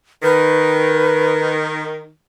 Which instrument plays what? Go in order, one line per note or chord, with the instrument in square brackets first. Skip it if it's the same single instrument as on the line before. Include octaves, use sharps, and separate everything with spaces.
[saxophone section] D#3 [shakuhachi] B4